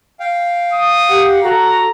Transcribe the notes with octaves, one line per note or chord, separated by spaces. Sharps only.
F5 G5
D#6
G4 F#5
F#4 A4 A#5